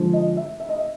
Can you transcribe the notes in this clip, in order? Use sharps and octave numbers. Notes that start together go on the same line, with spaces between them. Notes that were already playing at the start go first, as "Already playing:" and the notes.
Already playing: D3 F3 G#3
D#5
E5
E5
D#5
E5